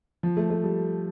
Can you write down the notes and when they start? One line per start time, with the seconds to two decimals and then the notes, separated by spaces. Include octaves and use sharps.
0.23 F3
0.37 A3
0.50 A3
0.64 G3